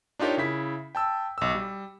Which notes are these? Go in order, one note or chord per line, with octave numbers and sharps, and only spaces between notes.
D4 D#4 F4 G4 A#4 C#5
C#3 E4 B6
G5 A5 E6
B1 E6
G3